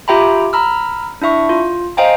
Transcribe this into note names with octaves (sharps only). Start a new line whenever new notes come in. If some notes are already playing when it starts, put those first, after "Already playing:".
F4 G4 E5 G5 A#5 B5
A#5 B5 E6 F6
D4 E4 E5 C#6
F4
C5 D#5 F5 G5 G#5 A#5